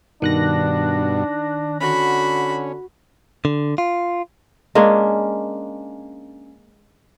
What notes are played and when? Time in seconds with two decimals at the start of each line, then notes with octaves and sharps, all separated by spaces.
0.22 G2 B2 D#3 D4 F#6 A#6
1.81 D3 C#4 F#4 B5
3.45 D3
3.78 F4
4.75 G#3 A#3 C#4 D4